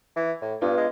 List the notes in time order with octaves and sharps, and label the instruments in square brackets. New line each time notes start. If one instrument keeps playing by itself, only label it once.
[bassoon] E3
A2
[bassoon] G2 [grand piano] B3 D4 F4
[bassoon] G#3